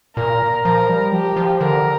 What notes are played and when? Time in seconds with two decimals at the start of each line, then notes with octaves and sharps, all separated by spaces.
0.16 A#2 A#4
0.65 F3 A#4
0.89 G3
1.12 F3 G4
1.36 F3
1.60 D3 A#4